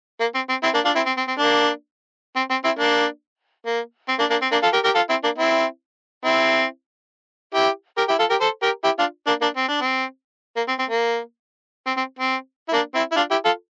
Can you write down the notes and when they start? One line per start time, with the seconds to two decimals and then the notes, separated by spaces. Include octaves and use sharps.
0.20 A#3
0.34 C4
0.49 C4
0.63 C4 E4
0.74 A#3 D4
0.85 D4 F4
0.95 C4 E4
1.06 C4
1.17 C4
1.28 C4
1.39 A#3 D4
2.36 C4
2.50 C4
2.64 C4 E4
2.79 A#3 D4
3.66 A#3
4.09 C4
4.19 A#3 D4
4.30 A#3 D4
4.42 C4
4.52 A#3 D4
4.63 F4 A4
4.73 G4 A#4
4.84 G4 A#4
4.95 F4 A4
5.09 C4 E4
5.24 A#3 D4
5.38 C4 E4
6.25 C4 E4
7.55 E4 G4
7.97 G4 A#4
8.08 E4 G4
8.19 F4 A4
8.30 G4 A#4
8.41 A4 C5
8.62 G4 A#4
8.84 E4 G4
8.99 D4 F4
9.27 A#3 D4
9.41 A#3 D4
9.57 C4
9.68 D4
9.81 C4
10.56 A#3
10.68 C4
10.79 C4
10.89 A#3
11.87 C4
11.97 C4
12.19 C4
12.68 E4
12.73 A#3 D4
12.95 C4 E4
13.12 E4
13.16 D4 F4
13.31 E4 G4
13.45 F4 A4